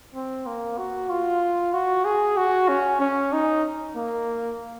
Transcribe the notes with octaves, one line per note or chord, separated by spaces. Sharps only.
C4
A#3
F#4
F4
F#4
G#4
F#4
C#4
C#4
D#4
A#3